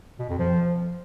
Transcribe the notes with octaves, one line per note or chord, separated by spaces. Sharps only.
B2
F2
F3